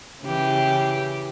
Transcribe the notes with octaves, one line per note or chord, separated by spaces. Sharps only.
C#3 E3 G4